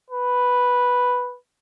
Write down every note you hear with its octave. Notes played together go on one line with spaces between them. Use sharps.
B4